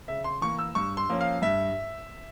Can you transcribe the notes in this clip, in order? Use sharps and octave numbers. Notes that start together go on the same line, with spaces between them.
C#3 E5
C6
E3 A#3 C#6
E6
G2 C#6
C6
F3 A#3 C#4
F5
G2 E5